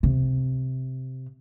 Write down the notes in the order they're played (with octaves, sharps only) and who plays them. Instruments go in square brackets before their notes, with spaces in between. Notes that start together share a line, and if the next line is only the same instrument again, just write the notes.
[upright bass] C3